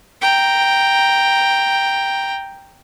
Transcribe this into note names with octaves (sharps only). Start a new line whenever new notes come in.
G5 A#5